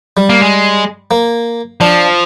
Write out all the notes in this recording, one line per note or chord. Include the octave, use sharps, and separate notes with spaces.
G3
A#3
G#3
A#3
F3 D4